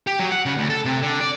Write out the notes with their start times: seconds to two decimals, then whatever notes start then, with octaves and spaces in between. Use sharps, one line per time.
0.07 G4
0.19 F#3
0.32 F#5
0.46 C#3
0.58 D2
0.70 A4
0.85 C3
1.02 D3
1.21 D5